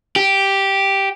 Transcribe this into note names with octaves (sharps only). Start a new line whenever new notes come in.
G4